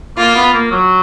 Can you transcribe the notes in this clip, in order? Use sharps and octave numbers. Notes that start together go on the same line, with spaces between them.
A#3 F4
B3
A#3
F#3